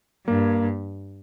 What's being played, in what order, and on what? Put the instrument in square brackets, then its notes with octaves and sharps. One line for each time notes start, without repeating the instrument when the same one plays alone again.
[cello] G2 [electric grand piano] A#3